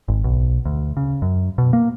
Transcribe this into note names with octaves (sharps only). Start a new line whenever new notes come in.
G#1
B1
D2
C#3
F#2
B2
A#3